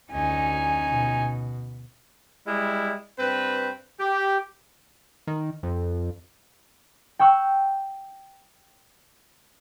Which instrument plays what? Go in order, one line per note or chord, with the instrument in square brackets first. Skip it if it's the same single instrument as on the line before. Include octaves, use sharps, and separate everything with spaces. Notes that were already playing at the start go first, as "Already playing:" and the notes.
[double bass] D2 [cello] C#4 D#4 [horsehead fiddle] G#5
[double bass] B2
[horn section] G3 G#3 E4
G2 C4 B4
G4
[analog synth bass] D#3
F2
[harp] G5 C#6 E6 F#6